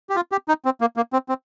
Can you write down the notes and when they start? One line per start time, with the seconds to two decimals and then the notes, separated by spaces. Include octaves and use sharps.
0.09 G4
0.16 F4
0.32 G4
0.48 D#4
0.65 C4
0.81 A#3
0.97 A#3
1.13 C4
1.29 C4